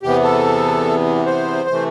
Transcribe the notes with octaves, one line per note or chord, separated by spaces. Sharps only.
E2 C3 E3 B3 G4
A4
C5
C3 E3 A3